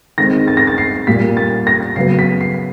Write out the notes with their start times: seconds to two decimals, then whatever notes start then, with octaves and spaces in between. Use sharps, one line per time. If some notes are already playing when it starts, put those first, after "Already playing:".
0.18 D#3 G#3 C4 A#6
0.48 A6
0.57 A#6
0.67 A6
0.78 C7
1.07 A#2 G3 A#3 B6
1.37 A6
1.67 A#6
1.96 C#3 F#3 B3 C7
2.19 B6
2.41 C7